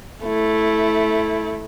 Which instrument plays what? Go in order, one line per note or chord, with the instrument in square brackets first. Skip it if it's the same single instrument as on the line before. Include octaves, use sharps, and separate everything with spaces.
[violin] A3 E4